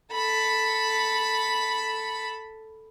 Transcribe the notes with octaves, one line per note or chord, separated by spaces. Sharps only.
A4 B5